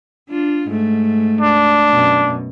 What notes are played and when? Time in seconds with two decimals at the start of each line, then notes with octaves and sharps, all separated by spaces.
0.30 D4 F4
0.68 G#2 A3
1.41 D4
1.90 F#2 B2